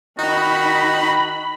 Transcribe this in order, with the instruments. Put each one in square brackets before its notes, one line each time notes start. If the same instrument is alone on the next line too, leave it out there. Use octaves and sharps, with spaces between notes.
[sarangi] D#3 [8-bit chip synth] D#4 [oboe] F#4 [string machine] B5